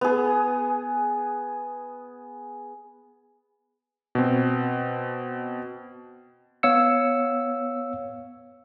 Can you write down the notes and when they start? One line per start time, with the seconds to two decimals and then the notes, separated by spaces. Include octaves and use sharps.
0.01 B3 G#4
4.15 B2 C4
6.63 B3 C#5 F5 E6 C#7